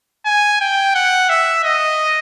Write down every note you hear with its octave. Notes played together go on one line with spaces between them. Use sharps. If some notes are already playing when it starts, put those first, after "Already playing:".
G#5
G5
F#5
E5
D#5